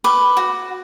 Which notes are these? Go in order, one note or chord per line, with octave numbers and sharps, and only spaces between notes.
B4 D6
F#4